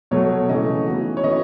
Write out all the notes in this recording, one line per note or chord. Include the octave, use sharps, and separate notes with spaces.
B2 F#3 A3 C#5
C#3 E3 A3 D#5
E3 B3 D#4 F#4
C#5
E3 A3 C#4 F#4 B4 D#5